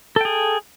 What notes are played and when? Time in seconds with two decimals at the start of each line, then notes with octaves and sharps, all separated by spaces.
0.16 A4
0.21 G5
0.25 G#4